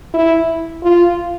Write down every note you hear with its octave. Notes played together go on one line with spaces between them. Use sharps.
E4
F4